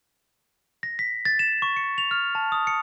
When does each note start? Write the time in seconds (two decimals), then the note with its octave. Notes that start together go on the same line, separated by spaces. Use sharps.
0.83 A#6
0.99 B6
1.25 A6
1.39 E7
1.62 C#6
1.77 C#7
1.98 F7
2.11 F6
2.35 A5
2.52 D#6
2.67 C#7